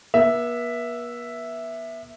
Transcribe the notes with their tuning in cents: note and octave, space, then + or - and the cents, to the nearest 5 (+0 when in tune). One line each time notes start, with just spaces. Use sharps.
B3 -45 E5 +0